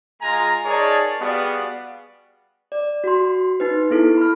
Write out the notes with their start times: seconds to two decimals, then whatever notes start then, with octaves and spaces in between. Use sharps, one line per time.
0.21 G#3 F4 G#5 A#5
0.65 D#4 G#4 A#4 C#5 D5 A5
1.20 G3 B3 F#4 G#4 D5 F5
2.72 D5
3.04 F#4 C6
3.60 D#4 B4
3.90 B3 E4 A4
4.17 B5 F6